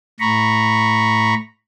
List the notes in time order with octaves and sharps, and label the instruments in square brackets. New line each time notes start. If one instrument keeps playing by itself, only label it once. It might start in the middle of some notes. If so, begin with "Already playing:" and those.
[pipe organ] A2 A#5 B5 C#6